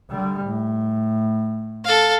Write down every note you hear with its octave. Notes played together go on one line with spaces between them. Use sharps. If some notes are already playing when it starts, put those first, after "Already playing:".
D3 G3
A2
A4 F5